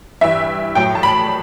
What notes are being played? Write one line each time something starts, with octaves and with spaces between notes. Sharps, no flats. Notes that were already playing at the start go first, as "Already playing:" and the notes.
G2 E3 G3 E5
A2 F#3 G5
A5
B5